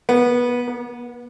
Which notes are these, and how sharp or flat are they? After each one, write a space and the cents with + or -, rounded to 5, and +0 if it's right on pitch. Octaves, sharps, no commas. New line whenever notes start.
B3 -20
B3 -45